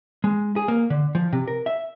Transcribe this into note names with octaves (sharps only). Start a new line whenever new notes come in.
G#3
G#4
A#3
D3
F3
C3
A#4
E5